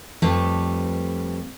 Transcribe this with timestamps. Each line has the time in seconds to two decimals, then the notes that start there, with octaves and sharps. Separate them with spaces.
0.22 F2 G3 A3 A4 B4